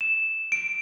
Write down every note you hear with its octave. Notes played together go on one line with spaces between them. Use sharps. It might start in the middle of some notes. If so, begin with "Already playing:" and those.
E7
D7